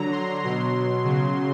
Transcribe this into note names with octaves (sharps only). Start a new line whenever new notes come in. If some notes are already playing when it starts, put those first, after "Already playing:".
Already playing: D3 F#3 A#5
C6
B2 F#3 C6
C#3 F#3